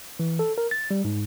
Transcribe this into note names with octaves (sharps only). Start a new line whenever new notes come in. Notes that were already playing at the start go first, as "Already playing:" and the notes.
E3
A4
A#4
A6
G3
G#2